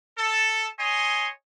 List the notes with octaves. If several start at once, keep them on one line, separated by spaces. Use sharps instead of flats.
A4
C#5 D#5 G#5 C6